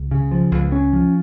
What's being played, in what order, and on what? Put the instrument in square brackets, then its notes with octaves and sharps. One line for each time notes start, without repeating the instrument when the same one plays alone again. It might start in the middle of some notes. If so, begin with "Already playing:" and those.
Already playing: [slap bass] C#2
C#3
F3
C#2
C#4
F3